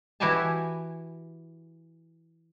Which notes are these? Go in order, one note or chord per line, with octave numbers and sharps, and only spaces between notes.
E3 E4 F#4 G4 G#5 A5